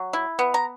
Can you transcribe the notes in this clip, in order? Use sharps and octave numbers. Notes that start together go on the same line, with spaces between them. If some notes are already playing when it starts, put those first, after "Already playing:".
Already playing: F#3
E4
B3
A#5